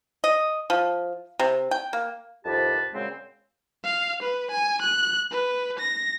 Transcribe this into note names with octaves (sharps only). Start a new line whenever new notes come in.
D#5
F3
C3
G5
A#3
C2 F2 D#3 G4 B4 A5
A#2 C#3 F#3 G#3 C4
F5
B4
G#5
F#6
B4
A#6